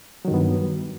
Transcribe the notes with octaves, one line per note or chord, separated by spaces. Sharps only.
G2 D#3 F#3 B3